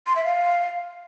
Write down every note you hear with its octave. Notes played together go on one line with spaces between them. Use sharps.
C6
E5
F5